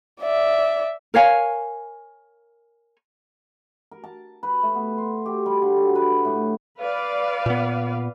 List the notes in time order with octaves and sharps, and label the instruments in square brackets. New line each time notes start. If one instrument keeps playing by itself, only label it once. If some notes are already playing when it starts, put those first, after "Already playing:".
[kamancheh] D5 E5
[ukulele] A#4 C#5 F5 G#5
[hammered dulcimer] A#4
A5
B4
A3
B3
C6
G4
G3
D3
F#3
B4
A2
[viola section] B4 D5 F5
[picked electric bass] A#2 B3